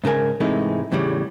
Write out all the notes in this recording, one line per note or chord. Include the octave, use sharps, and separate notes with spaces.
G#2 C#3 A4 A#4 G#5
G#2 C3 E3 G#3 A3 D#4
E2 A2 C#3 G3